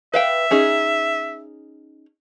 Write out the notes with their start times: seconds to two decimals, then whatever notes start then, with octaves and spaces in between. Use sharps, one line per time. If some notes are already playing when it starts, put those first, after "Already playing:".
0.14 B4 E5 F5 G5
0.51 C#4 D#4 G#4